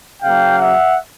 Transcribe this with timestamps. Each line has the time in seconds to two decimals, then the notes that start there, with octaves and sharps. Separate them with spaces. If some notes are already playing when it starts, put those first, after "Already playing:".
0.22 C#3 F#3 A#3 F5 G5
0.59 E5 F#5